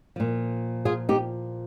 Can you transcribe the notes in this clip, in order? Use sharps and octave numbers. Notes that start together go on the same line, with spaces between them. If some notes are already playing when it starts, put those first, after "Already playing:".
A#2 F3
F4 G#4
D#4 G4